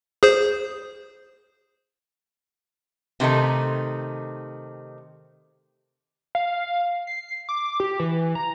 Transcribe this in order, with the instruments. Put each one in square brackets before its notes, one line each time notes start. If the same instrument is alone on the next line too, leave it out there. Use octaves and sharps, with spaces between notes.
[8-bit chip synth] G#4 C5
[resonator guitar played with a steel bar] C3 D#3 A3 D#4
[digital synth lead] F5
C7
D6
G4
E3
A#5